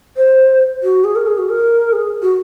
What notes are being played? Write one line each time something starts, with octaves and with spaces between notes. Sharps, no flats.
C5
F#4
G#4
A#4
G#4
F#4
A#4
G#4
F#4